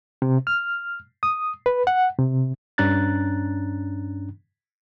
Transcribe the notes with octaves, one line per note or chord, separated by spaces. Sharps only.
C3
F6
D#6
B4
F#5
C3
G2 C#4 D4 A#5 F#6 A6